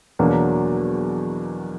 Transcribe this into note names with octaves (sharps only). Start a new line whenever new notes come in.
E2 B2 F#3 A#3 D4